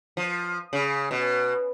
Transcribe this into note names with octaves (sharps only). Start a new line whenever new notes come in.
F3
C#3
B2